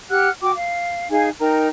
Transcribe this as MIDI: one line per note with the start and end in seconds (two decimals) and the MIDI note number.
0.10 0.29 67
0.10 0.29 78
0.10 0.29 89
0.10 0.29 90
0.42 0.53 66
0.42 0.53 79
0.42 0.53 86
0.56 1.10 77
1.11 1.30 63
1.11 1.30 68
1.11 1.30 77
1.11 1.30 80
1.39 1.68 63
1.39 1.68 70
1.39 1.68 79
1.39 1.68 82